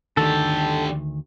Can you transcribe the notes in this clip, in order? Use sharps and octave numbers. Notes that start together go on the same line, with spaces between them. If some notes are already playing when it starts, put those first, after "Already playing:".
D2 D3 D#3 G4 A4